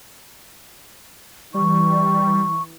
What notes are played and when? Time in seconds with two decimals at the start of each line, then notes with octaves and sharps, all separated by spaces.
1.54 E3 G3 C#6